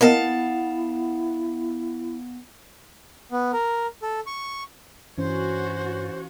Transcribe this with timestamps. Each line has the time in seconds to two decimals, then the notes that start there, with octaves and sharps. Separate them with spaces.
0.01 A#3 B3 E4 A#4 D#5 F5 A5
3.32 B3
3.53 A#4
4.02 A4
4.27 C#6
5.18 G2 E3 C#4 F#4 C5 C#5